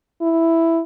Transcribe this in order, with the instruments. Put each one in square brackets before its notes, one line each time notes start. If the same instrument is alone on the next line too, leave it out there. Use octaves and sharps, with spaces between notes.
[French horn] E4